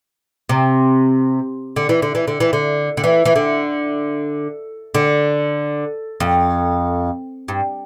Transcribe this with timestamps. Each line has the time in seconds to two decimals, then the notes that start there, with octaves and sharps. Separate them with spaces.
0.49 C3
1.76 D3
1.89 E3
2.02 D3
2.15 E3
2.27 D3
2.40 E3
2.53 D3
2.97 D3
3.04 E3
3.25 E3
3.36 D3
4.94 D3
6.20 F2
7.48 G2